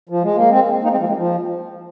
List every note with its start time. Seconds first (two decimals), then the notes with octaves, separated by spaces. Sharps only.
0.09 F3
0.23 G#3
0.36 A#3
0.50 G#3 C4
0.83 A#3 D#4
0.91 G#3 C4
1.00 F3 A#3
1.08 G#3
1.16 F3